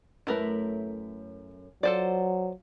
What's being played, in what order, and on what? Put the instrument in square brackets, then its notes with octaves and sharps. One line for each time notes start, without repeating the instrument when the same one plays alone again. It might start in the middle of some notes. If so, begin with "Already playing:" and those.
[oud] F#2 A3 [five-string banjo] E4 A#4 B4
[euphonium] F#3 [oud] F4 [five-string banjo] A4 C5 D5